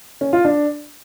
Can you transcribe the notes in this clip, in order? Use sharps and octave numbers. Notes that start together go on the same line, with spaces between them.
C#4
F4
D4